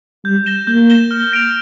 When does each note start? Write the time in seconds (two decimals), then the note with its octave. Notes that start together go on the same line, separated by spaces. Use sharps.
0.25 G3 G6
0.46 A#6 E7 G7
0.67 A#3 G6
0.90 A#6 E7 G7
1.11 F6
1.32 A#6 D7 F7